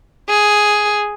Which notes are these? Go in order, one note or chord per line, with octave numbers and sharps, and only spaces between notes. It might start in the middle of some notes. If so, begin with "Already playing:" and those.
G#4